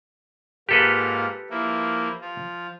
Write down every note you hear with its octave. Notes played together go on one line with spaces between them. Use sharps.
G#2 A#3 F4 G4 A4 B4
F3 A#3 E4
F3 F4